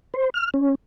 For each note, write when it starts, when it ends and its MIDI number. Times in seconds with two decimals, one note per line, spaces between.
0.14 0.30 72
0.34 0.50 89
0.54 0.75 61